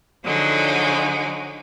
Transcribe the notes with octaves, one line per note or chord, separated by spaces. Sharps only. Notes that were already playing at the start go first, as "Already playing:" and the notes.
D3 F3 F#3 G#3 D#4